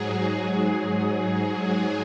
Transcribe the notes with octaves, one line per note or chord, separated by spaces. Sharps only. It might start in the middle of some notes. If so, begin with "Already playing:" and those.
Already playing: G#2 F#3 G#4